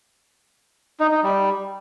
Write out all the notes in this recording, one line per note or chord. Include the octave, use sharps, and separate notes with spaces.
D#4
D#4
G3